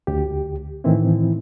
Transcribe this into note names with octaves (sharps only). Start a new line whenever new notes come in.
D2 G4
A2 D#3 E3 C4 E4